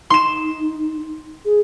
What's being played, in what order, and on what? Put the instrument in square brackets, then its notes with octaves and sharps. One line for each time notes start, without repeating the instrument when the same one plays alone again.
[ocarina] D#4 [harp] C6 E7
[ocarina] G#4